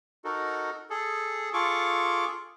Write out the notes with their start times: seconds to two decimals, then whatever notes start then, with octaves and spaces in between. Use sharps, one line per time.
0.24 D#4 F#4 A4 A#4
0.90 G#4 A4
1.53 F4 G#4 A4 C#6 D6